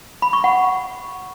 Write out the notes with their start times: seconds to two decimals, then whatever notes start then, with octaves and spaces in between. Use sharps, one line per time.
0.22 B5
0.33 C#6
0.44 F#5